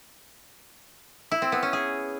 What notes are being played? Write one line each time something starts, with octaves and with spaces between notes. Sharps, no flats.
E4
C4
B3
C#4
G#4